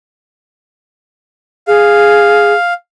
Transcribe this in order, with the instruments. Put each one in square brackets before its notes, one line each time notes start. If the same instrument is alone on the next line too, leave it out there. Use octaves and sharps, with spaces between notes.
[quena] G#4 [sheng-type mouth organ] F5